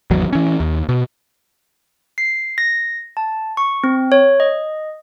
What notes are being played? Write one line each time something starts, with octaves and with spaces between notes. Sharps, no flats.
G#1 E2 F#3
E3 C#4
D#2
B2
C7
A#6
A5
C#6
C4
C#5
D#5